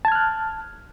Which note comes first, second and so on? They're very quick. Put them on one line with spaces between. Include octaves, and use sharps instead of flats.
A5 G#6 F6 F#6